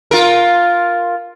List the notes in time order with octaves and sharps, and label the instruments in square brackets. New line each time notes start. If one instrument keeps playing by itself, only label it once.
[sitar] F4 A#4